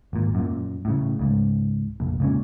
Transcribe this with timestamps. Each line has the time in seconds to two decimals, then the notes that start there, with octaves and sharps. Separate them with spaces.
0.13 G#1 A#2
0.35 F#2 A#2
0.85 A2 C#3
1.19 C#2 G#2
2.00 F1 A#1
2.20 C#2 A#2 C#4